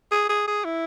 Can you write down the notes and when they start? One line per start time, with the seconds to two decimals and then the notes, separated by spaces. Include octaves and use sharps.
0.11 G#4
0.29 G#4
0.47 G#4
0.65 E4